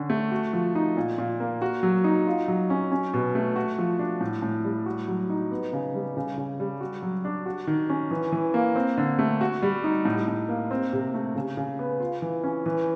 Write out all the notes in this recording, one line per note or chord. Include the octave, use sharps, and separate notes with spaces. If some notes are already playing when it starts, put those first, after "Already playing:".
Already playing: D3 C#4
A3
F#4
F3
D#4
A#2
A#2
A#3
F#4
F#3
D#4
F4
F#3
C#4
C#4
B2
A3
F#4
F3
D4
A2
A2
G3
F#4
F#3
D#4
B3
C#3
G3
C#3
C#3
G3
F#4
F#3
D4
F#4
D#3
C#4
E3
E3
A#3
C4
D3
A3
F#4
G3
D#4
A2
A2
A#3
C4
C3
A3
C#3
C#3
B3
F4
E3
C#4
E3